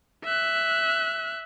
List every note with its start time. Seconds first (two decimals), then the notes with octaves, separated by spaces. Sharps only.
0.25 E5 F#6